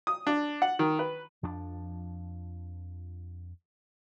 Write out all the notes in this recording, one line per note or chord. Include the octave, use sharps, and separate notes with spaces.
D#6
D4
F#5
D#3
B4
F2 F3 D4